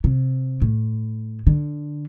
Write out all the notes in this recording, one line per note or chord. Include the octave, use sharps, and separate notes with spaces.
C3
A2
D3